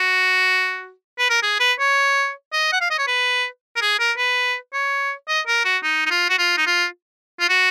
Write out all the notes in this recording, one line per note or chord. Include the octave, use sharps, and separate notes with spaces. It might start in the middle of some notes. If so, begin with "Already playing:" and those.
Already playing: F#4
B4
A#4
G#4
B4
C#5
D#5
F#5
F5
D#5
C#5
B4
A#4
G#4
A#4
B4
C#5
D#5
A#4
F#4
D#4
D#4
F4
F#4
F4
D#4
F4
F4
F#4